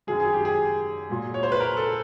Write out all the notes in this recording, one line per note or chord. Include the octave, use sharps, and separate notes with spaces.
F#2 D#3 F#3 G#4
G#4
G4
G#4
A#2 F#3
C#5
C5
B4
A#4
A4